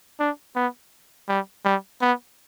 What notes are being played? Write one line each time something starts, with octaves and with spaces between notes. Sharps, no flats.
D4
B3
G3
G3
B3